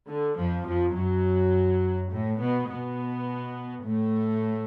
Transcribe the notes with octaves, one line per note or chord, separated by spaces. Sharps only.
D3
F2 F3
F2 F3
F#2 F#3
A2 A3
B2 B3
B2 B3
A2 A3